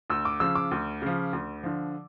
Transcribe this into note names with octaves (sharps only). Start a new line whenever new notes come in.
D2 E6
D6
C#3 F3 E6
D6
D2
C#3 F3
D2
D3 F3